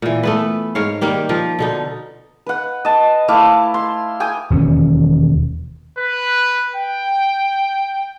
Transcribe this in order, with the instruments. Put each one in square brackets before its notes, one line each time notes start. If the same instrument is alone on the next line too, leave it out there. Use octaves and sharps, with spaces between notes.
[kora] A#2 E3
A3 B3 B4
G#2 A#4 C#5 F5
D#3 G3 A#3 G4
F3 A#4
B2 D3 D#4
[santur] B4 F#5
D#5 A5
A3 E4 F5 D6
C6
G5 G#5 D#6
[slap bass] E1 D#2 C#4
[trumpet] B4
G5